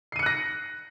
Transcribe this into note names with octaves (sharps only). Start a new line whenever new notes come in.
F#6 A#6 C7 C#7 D#7